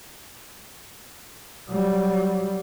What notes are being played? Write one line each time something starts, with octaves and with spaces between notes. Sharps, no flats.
F#3 G3